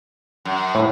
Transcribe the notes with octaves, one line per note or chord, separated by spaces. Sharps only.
F#2
A2